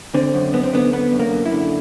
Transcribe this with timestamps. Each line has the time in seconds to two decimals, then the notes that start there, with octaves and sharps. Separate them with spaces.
0.14 D3 C4
0.34 F#2
0.53 F#2 B3
0.63 C4
0.73 D3 B3
0.93 D3 B3
1.12 F#2
1.19 A#3
1.33 F#2
1.46 E4
1.52 D3